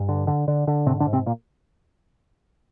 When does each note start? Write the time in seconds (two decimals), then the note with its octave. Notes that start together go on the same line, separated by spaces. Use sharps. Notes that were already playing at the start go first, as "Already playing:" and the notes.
Already playing: G2
0.09 D3
0.27 D3
0.48 D3
0.67 D3
0.87 G#2 C3 C4
1.00 D3 D4
1.07 G#2
1.13 C3 C4
1.26 A#2 A#3